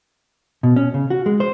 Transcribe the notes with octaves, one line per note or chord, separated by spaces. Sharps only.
B2
C#4
C#3
F#4
G#3
C5